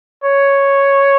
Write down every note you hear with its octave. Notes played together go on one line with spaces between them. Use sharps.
C#5